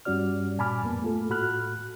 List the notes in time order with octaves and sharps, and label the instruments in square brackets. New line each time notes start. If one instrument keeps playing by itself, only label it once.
[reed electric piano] G2 G3 C#4 F#4 D5 F6
A#2 G#5 A5 B5 D6 F6
F2 A2 A#3 B3
A3 F4 A4
A2 F#4 B5 F6 F#6